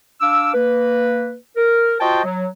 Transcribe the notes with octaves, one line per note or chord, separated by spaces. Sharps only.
D4 F5 D6 E6
A#3 B4
A#4
F4 F#4 C5 D#5 G5 A5
F#3